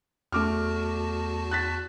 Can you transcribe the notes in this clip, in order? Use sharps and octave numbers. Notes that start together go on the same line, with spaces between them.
E2 A3 F#4 A5 D6 F6
F#6 A6 B6